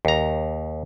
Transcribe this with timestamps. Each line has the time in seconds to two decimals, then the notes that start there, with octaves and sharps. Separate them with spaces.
0.05 D#2 A#5